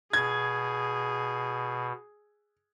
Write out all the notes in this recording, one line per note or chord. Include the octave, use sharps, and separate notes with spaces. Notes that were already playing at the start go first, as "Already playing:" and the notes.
B2 G#4 G#6